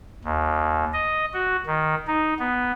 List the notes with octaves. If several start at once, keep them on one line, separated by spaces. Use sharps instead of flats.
D#2
D#5
F#4
D#3
D#4
B3